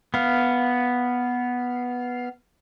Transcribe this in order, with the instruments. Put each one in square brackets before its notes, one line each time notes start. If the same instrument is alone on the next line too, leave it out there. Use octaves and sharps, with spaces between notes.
[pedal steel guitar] B3 F5